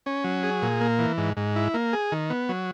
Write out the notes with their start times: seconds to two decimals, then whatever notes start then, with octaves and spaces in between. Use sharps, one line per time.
0.06 C#4
0.24 F#3
0.43 G#4
0.62 A#2
0.81 A#3
0.99 E3
1.18 G#2
1.37 G#2
1.56 E4
1.74 A#3
1.93 G#4
2.12 D#3
2.30 B3
2.49 F#3